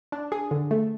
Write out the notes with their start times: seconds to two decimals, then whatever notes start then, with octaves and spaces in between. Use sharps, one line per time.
0.12 D4
0.32 G#4
0.51 D3
0.71 A3